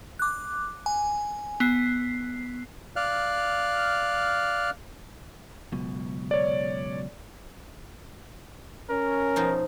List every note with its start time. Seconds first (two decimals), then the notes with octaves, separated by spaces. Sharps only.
0.19 D6 F#6
0.86 G#5
1.60 B3 C7
2.96 D5 F5 F6 F#6
5.72 C#2 F#2 B2
6.31 C#5 D5
8.90 C#4 A#4
9.36 B2 F3 D#4